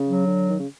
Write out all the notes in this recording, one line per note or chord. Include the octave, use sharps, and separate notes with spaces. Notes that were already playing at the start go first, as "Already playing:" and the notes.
Already playing: C#3
F#3
D3
D#3
C#3